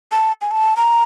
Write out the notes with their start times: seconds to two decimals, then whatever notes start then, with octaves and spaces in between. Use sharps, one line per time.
0.12 A5
0.41 G#5
0.51 A5
0.77 A#5